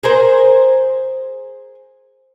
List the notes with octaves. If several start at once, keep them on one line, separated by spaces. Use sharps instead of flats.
G#4 A#4 C5